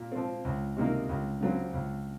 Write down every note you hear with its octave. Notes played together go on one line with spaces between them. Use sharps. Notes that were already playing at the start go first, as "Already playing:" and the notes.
Already playing: A#2
F3 C4
C#2
C3 D#3 A#3 D#4
C#2
C#3 F#3 C4
C#2